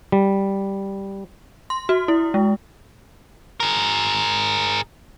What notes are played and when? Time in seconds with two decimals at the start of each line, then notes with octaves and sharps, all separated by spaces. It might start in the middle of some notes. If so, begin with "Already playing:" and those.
0.12 G3
1.70 C6
1.89 F#4
2.08 E4
2.34 G#3
3.60 G#4 A#4